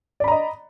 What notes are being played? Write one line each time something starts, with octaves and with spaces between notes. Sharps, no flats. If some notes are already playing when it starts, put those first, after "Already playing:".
D5 D#5 A#5 B5